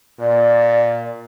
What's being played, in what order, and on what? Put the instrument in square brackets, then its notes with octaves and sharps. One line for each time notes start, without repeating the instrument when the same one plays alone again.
[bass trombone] A#2 [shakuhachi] D5